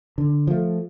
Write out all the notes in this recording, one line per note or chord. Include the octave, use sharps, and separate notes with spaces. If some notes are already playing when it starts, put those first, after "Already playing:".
D3
F3 A3